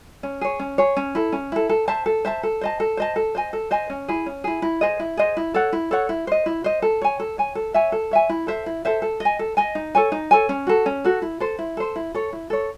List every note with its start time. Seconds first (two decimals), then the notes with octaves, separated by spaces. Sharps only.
0.23 C#4
0.41 G#4 C#5
0.60 C#4
0.78 G#4 C#5
0.97 C#4
1.15 E4 A4
1.32 C#4
1.52 E4 A4
1.69 A4
1.88 C5 E5 A5
2.06 A4
2.25 C5 E5 A5
2.43 A4
2.61 C5 D#5 A5
2.80 A4
2.97 C5 D#5 A5
3.16 A4
3.35 C5 D#5 G#5
3.53 A4
3.71 C5 D#5 G#5
3.90 C#4
4.08 E4 G#4
4.26 C#4
4.44 E4 G#4
4.62 E4
4.81 G#4 C5 D#5
5.00 E4
5.17 G#4 C5 D#5
5.37 E4
5.54 A4 C#5 F#5
5.73 E4
5.91 A4 C#5 F#5
6.09 E4
6.27 C5 D#5
6.46 E4
6.64 C5 D#5
6.82 A4
7.02 C#5 G#5
7.20 A4
7.38 C#5 G#5
7.55 A4
7.74 C#5 E5 G#5
7.92 A4
8.11 C#5 E5 G#5
8.29 E4
8.47 A4 C5 E5
8.66 E4
8.85 A4 C5 E5
9.02 A4
9.20 D#5 G#5
9.39 A4
9.57 D#5 G#5
9.75 D#4
9.95 A4 C#5 G#5
10.12 D#4
10.31 A4 C#5 G#5
10.49 C#4
10.67 F#4 A4
10.86 C#4
11.05 F#4 A4
11.22 E4
11.40 A4 C5
11.59 E4
11.77 A4 C5
11.96 E4
12.14 A4 C#5
12.33 E4
12.50 A4 C#5